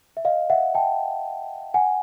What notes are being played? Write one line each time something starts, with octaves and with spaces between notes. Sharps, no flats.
E5
D#5 F5
E5 F#5
G5 A5
F#5 G#5